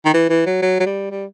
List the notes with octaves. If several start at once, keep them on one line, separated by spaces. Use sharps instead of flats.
D#3
E3
E3
F#3
F#3
F#3
G3
G3